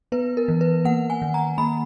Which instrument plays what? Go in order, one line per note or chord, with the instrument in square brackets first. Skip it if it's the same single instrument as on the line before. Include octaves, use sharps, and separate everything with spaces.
[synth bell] B3 B4
A#4
E3
B4
A#3 F#5
G#5
D#3
A#5
A#3 B5